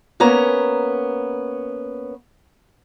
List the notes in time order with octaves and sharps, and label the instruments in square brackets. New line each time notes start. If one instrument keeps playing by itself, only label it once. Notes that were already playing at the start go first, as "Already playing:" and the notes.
[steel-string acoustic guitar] A#3 B3 C#4 A#5